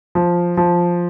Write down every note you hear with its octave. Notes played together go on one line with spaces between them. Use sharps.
F3
F3